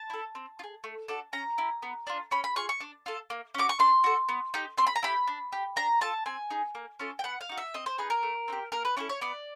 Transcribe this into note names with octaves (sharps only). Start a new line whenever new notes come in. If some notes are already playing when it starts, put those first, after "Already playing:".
Already playing: A5
E4 A4
C4
F4
G#4
A3
D4 F#4 A4
C#4 A#5
E4 G4
B3
D4 F4
C#4 B5
B5
F4 G#4 C#6
C#6
D4
F4 A4
A#3
C#4 F#4 D6
C#6
D4 C6
F#4 A4
B3
D#4 G4
C4 C6
B5
A#5
E4 G4 B5
D4
G4
D4 A#5
F4 A4 A5
C4 G#5
D#4 G#4
A#3
C#4 F4 A4
G5
B3 F#5
F5
D#4 F#4
E5
C4 D#5
C5
D#4 G#4 B4
A#4
A3
C4 D#4 G4
A#3 A#4
B4
C#4 E4 A4 D5
C#5
B3 D5